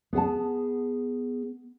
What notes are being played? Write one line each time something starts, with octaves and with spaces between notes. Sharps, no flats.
B3 G#4 F#5 A5